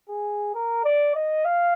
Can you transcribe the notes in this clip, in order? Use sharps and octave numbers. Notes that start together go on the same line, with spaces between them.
G#4
A#4
D5
D#5
F5